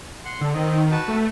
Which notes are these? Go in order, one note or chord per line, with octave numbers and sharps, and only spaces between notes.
F#5 C6
D3 A4
D#3 C4 D#5
F#4 B4 A5
A3